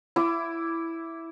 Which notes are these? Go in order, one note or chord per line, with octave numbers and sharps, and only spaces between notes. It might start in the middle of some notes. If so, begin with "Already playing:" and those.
E4 D6